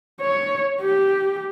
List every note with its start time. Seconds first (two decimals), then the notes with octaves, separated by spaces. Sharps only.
0.21 C#5
0.82 G4